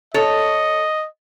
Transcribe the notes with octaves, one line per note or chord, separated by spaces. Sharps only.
A4 C#5 D#5